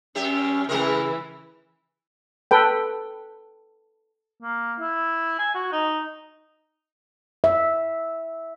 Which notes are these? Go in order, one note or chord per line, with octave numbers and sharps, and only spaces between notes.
F#2 C#4 G4 E5
C#3 E3 G#3 C4 E4 A#4
A4 B4 G5
A#3
E4
G#5
F#4
D#4
E5